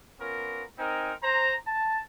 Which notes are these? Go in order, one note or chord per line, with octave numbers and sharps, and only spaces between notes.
B3 C#4 F4 A#4
C4 D#4 A#4 G#5
C5 A#5
A5